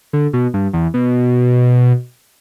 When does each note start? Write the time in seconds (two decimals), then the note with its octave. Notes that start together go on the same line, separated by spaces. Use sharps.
0.13 D3
0.33 B2
0.54 G2
0.73 E2
0.94 B2